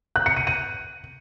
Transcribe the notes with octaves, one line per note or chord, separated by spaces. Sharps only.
F#6
C#7
D#7
D#7